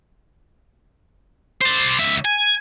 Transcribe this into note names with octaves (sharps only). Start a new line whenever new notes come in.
C5 D5
C#2 E5
G#5